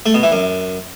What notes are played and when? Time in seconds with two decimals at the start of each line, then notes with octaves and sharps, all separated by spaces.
0.06 A3
0.14 B2
0.23 E3
0.32 F#2